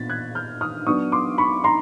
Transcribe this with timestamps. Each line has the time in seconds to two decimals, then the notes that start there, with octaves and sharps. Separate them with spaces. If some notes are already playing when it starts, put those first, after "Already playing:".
Already playing: A#2 B3 D4 A6 B6
0.10 F#6 G#6
0.35 F6 G6
0.61 D#6 F6
0.87 F#3 B3 D4 C#6 D#6
1.12 C6 D6
1.38 B5 C#6
1.64 A#5 C6